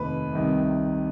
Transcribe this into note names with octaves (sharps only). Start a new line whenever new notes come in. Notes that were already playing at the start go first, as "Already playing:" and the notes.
Already playing: F1 D#2 D#3 B4
C2 C3 D#3